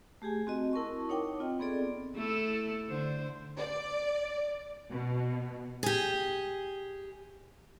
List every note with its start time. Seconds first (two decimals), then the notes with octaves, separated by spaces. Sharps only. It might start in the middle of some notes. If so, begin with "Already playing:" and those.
0.22 A3 G4 G#4 G#5
0.47 C4 F#4 D#5
0.73 E4 A#4 A5 C#6
1.09 D#4 C#5 F#5 G5 D6
1.39 C4 F4 D#5
1.59 B3 C4 G#4 A4 D5
2.15 A3 E4 A4
2.89 D3 C5
3.58 D5
4.90 B2
5.83 G4 G#4